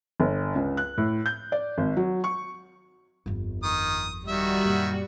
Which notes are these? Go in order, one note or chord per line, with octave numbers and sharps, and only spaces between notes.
G1
C#2
F#6
A2
G6
D5
G#1
F#3
C#6
G1 F2
D#3 D#6
D#3 G3 F#4 E5
F#2 A#2